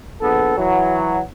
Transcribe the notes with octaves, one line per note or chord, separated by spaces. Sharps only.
A#1 B3 A4
E3 F#3